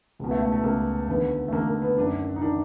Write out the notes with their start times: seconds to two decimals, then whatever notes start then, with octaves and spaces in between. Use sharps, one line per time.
0.19 C#2 B2
0.31 A3
0.42 A3
0.52 A3
0.63 C#2 B2 A#3
1.08 D#2 D3 B3
1.48 A3
1.52 D#2 D3 A#3
1.68 A#3
1.82 B3
1.97 F#2 D#3 D4
2.36 D#4
2.42 D#3 D4